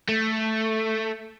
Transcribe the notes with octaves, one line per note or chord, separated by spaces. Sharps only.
A3